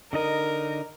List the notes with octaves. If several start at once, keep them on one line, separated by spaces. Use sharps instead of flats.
D3 D#4 A#4 D#5